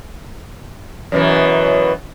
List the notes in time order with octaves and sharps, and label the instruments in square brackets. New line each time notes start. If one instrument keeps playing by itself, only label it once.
[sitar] F#2 B2 E3